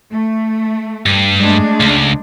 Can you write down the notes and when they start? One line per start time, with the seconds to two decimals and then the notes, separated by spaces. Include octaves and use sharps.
0.11 A3
1.06 G2
1.40 G#3 A3 D4
1.80 C#2